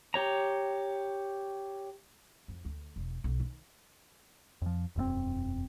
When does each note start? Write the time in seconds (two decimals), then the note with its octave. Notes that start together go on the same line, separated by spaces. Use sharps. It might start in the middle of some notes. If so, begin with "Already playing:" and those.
0.14 G4 C#5 A#5
2.48 F2
2.65 D2
2.96 E1
3.24 B1
3.40 D#3
4.62 F2 F3
4.96 E1 F#2 A3 C4